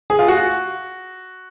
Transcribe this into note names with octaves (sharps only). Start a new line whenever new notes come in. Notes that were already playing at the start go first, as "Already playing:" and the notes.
G#4
F4
F#4